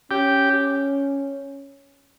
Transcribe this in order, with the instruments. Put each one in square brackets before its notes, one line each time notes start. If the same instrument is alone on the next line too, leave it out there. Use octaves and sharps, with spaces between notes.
[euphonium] C#4 [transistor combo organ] G4